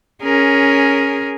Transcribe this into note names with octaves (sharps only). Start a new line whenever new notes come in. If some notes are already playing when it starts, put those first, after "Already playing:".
C#4 G#4 A#4